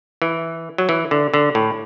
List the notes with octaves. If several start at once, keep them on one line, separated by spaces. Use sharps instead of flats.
E3
F#3
E3
D3
D3
A2